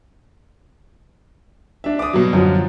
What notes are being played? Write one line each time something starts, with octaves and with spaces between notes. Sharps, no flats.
D4 E5
D6 D#6
B2 F#3
F#2 D3 F3